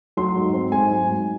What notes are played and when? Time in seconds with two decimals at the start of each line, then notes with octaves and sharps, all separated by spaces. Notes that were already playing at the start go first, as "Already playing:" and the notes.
0.17 F#3 C6
0.35 G#2
0.53 C4
0.72 G#2 G#5
0.90 F#3
1.10 G#2